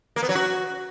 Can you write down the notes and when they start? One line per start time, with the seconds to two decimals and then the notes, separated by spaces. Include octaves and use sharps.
0.16 A#3
0.23 B3
0.29 F#3
0.35 F#4